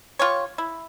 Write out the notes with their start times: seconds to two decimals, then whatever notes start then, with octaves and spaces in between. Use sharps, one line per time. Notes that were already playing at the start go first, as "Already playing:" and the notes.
0.19 F4 G4 C#5
0.58 E4